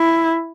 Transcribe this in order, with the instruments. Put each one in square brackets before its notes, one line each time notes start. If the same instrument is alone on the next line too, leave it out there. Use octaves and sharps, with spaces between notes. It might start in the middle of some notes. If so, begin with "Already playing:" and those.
Already playing: [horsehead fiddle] E4